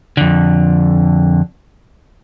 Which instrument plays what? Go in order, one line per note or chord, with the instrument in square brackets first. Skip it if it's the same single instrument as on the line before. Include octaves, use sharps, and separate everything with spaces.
[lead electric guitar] F2 D3